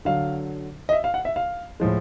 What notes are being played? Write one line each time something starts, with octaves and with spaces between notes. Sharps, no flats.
D3 F#3 F5
D#5
E5
F5
F#5
E5
F5
A2 F3 G#3